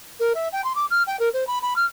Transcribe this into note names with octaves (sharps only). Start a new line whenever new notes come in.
A#4
E5
G5
C6
D6
F6
G5
A#4
C5
B5
B5
F6